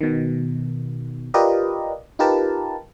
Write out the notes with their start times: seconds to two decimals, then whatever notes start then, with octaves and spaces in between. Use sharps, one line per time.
0.01 B2 D#3
1.34 F4 G4 A#4 B4 D5 D#5
2.19 D#4 F4 G4 A#4 B4 A5